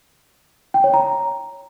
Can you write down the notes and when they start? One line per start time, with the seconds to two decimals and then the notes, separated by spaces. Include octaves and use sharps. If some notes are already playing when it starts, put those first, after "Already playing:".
0.74 G5
0.84 C#5
0.94 A#5